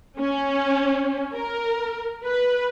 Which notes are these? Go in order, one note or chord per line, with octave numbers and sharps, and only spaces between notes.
C#4
A#4
B4